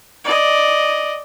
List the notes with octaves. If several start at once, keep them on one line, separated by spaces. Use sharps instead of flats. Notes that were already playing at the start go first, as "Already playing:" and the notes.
D5 D#5